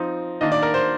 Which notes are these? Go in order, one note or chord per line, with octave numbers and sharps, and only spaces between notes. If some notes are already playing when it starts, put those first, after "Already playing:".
Already playing: F3 C4 D#4
D#3 A#3 D4 D#5
D5
A#4
C5